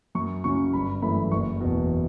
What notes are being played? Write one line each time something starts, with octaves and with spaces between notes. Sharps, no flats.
F#2 C#6
C#3 F#3 C#4 C#6
G1 B5
F#2 E3 A3 B5
F#1 C#6
E2 B2